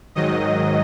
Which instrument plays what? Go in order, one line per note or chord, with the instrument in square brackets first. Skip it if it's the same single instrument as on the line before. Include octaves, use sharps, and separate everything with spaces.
[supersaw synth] G#2 D#3 F#3 D#5